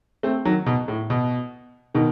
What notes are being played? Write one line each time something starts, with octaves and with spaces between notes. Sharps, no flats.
A3 C4
D#3 F#3
B2
A2
B2
B2 D#3